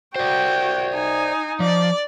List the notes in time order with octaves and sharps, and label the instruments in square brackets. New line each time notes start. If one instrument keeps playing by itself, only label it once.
[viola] F#4 G5 [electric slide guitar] C5 D5
[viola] D#4 [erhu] G#5
[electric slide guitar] F3 [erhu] D5